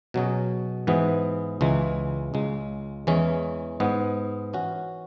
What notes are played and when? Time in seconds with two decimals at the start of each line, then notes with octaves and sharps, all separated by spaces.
0.14 B2 F#3 C#4 G#4
0.87 G#2 E3 B3
1.61 C#2 C#3 E3 G#3
2.34 C#2 C#3 G#3
3.07 E2 E3 G#3 C#4
3.80 G#2 G#3 B3
4.53 E3 C#4 F#4